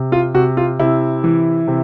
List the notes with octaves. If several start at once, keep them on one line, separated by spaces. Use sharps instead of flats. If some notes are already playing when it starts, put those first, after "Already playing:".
Already playing: C3
F4
C3 F#4
F4
C3 E4
E3
C3